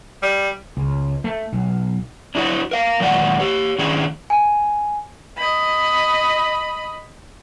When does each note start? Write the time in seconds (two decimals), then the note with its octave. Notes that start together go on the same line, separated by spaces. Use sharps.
0.23 G3
0.77 C#2
1.24 A3
1.53 B1
2.35 D4 E4 F#4 C#5
2.71 A#4 F5
3.00 A#2 D#3 F#3 G#3 D5 F#5
3.40 G4 C#5
3.78 A2 D#3 C#4 D4 G#4
4.30 G#5
5.37 D#5 B5